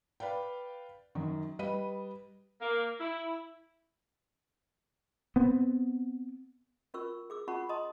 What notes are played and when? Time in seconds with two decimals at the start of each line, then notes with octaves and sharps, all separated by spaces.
0.20 B4 D5 F5 G5
1.15 F#2 D#3
1.59 G3 B4 D#5 D#7
2.61 A#3
3.00 E4
5.36 B3 C4
6.94 C#4 F4 A#4 C#6 E6
7.30 G#4 D6 E6
7.48 C#4 F4 F#5 A5 B5 C#6
7.69 D#5 A5 A#5 C6 D#6